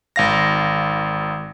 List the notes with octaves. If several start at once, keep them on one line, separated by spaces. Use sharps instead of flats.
G#1 F5 A#6